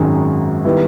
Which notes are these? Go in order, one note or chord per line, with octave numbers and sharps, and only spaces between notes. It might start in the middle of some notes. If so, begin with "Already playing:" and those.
Already playing: G#1 F#2 D#3 G#3
D#3 G3 B3 E4